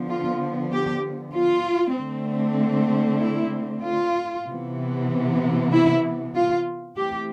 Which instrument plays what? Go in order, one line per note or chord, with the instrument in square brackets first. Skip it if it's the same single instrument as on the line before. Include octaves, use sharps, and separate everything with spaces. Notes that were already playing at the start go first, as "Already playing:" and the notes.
Already playing: [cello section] D3 F3 B3
F4
G4
F4
D3 A3 C4
E4
F4
C3 E3 B3
E4
F4
E3 A3 C4 G4